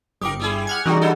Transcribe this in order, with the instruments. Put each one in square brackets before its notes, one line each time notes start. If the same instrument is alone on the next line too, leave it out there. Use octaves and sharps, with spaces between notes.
[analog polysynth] G1 [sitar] G4 A#4 [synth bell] G5 D6 D#6
[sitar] G3 E4 G#4
[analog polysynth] F#5 F6 G#6
[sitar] B2 [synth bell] E3 G#4 [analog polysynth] G3 D#4 F#4
[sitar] D4 E4 A4